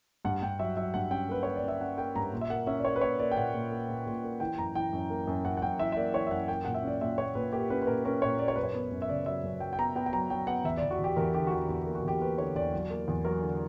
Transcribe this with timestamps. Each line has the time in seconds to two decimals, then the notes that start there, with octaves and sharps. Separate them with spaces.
0.25 G2 F#5
0.42 G2 G5
0.59 F#3 E5
0.77 F#3 E5
0.94 G2 F#5
1.11 C#4 G5
1.28 A#3 B4
1.43 A#3 C#5
1.56 D5
1.63 C#4 E5
1.80 C#4 F#5
1.97 A#3 G5
2.15 G2 A#5
2.33 A#2
2.41 E5
2.50 A#3 F#5
2.67 C#4 E5
2.79 D5
2.84 A#3 C#5
2.96 B4
3.01 A#3 C#5
3.19 A#3 D5
3.31 G5
3.36 A#2 F#5
3.53 A#2
3.71 A#3
3.89 A#2
4.06 A#2
4.23 A#3
4.40 E3 G5
4.58 F#2 A#5
4.75 E3 G5
4.93 F#2
5.10 A#3
5.27 F#2
5.45 F#2 F#5
5.57 F#5
5.62 F#2 G5
5.79 E3 E5
5.92 E5
5.96 A#3 D5
6.14 E3 C#5
6.27 E5
6.31 F#2 F#5
6.48 A#3 G5
6.65 A#2 F#5
6.74 E5
6.83 C#4 D5
7.01 A#2 E5
7.18 A#2 C#5
7.35 A#2 B4
7.52 A#3 G4
7.70 C#4 B4
7.82 B4
7.87 A#2 A#4
8.05 C#4 A#4
8.22 A#2 C#5
8.39 A#3 D5
8.48 C#5
8.56 F#2 B4
8.63 C#5
8.74 B3
8.91 F#2
9.02 E5
9.09 C#3 D5
9.26 F#3 E5
9.43 F#2
9.60 F#3 G5
9.73 G5
9.78 B3 A#5
9.95 B3 G5
10.06 G5
10.12 F#3 A#5
10.30 F#3 G5
10.47 B3 F#5
10.64 E2 E5
10.77 D5
10.83 E2
10.91 F#4
10.99 E2
11.04 G4
11.16 E2 A#4
11.34 D3 G4
11.47 F#4
11.52 E2 G4
11.69 E2 F#4
11.82 G4
11.86 A#3
11.95 F#4
12.03 E2 G4
12.20 A#3 B4
12.38 D3 C#5
12.56 E2 D5
12.72 F#3
12.90 A#3
13.08 E2
13.25 F#3 A#4
13.42 D3